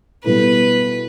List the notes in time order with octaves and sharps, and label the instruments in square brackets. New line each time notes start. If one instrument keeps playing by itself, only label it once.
[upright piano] B2 G3 B3 E4 A4 [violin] B4